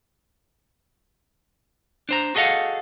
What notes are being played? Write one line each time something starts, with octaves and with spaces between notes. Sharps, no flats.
D4 C5 A#5
F#4 G#4 A4 D#5 F5 F#5